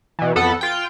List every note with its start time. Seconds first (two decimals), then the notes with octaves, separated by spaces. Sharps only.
0.19 B2 E3
0.35 F2 B3 A4 F#5
0.61 F4 G5